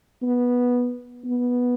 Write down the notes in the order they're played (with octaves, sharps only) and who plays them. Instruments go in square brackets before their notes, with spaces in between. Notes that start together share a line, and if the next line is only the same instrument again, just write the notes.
[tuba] B3
B3